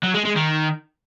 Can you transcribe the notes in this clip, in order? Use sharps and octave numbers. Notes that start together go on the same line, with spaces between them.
F#3
G#3
G#3
D#3